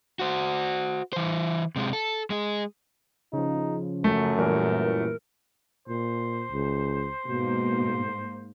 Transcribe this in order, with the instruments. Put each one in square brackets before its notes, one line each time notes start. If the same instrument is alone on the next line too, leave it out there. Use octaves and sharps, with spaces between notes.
[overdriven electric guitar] F#4 C5
E3 C5
C3 G#3
A4
G#3 G#4
[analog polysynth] C#3 F3 [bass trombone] D#4
[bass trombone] F#2 [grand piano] A3
[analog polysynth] A#2 E3 G3 [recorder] A#4
[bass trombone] A#2 [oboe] C5
[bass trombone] C#2
[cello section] G#2 A#3 [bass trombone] B2